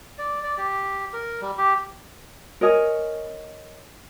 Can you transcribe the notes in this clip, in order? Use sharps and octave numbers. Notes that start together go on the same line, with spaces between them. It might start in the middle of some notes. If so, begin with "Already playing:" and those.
D5
D5
G4
A#4
G3
G4
A#4 C#5 D#5 G#5